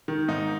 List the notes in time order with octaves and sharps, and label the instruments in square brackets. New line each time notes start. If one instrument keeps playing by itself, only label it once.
[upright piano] D#3
G#2 D#4